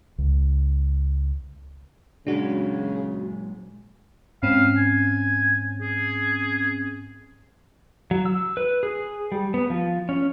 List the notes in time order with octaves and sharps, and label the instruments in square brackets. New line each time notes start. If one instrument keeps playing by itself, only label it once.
[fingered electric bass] C#2
[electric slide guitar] A#2 F#3 G#3 [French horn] C#3 [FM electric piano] D4 F#4
[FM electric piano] G#2 C4 C#4 [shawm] F5
[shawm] G#5
G#4
[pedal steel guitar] F#3
E6
B4
G#4
G3
B3
F3
C#4